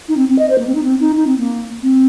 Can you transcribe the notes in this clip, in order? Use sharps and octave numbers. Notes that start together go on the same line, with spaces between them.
D#4
C4
C4
D#5
C5
A#3
C4
D#4
C4
D#4
D#4
C4
A#3
C4